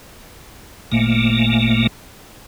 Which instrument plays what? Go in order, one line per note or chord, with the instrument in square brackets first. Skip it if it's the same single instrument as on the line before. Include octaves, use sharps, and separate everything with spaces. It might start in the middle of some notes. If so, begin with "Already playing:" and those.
[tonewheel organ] G#1 A#2 A3 A#3